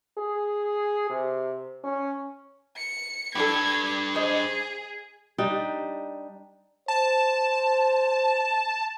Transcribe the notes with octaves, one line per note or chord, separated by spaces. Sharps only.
G#4
C3
C#4
C#7
D4 G4 A4 B4 G#6
G#4 C5 D#5
G3 D4 D#4
C5 A5